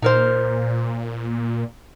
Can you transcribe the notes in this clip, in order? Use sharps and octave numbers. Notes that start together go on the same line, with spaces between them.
A#2 D#4 A#4 C5